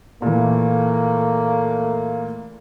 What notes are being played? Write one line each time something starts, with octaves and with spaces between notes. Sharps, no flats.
A#2 E3 A3 A#3